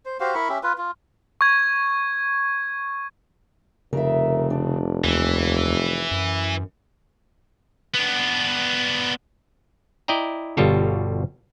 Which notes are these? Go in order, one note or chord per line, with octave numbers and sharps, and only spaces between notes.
C5
F#4 G4 C5 F5
E4 A#4 B5 C#6
C#4 G4 E5
F4 B4
F4
C#6 G#6
F1 C#3 A#4 E5
D4
D#2 E3
F#2
B3 D4
E4 D5 D#5 G5 A#5
G1 B2 G3 F4 A4 C#5